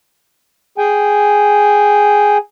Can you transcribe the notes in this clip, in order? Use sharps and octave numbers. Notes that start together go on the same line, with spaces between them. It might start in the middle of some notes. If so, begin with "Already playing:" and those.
G#4 G5 G#5